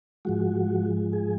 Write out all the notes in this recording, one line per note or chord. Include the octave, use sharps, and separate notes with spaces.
G#2 F3 G#3 F#4
G#4